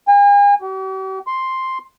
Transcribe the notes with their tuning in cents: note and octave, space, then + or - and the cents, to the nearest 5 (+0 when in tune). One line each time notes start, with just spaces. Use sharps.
G#5 -40
G4 -45
C6 +5